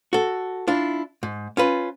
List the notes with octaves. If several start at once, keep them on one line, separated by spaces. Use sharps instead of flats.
F#4 A4
D4 E4 F4
G#2
C#4 F4 B4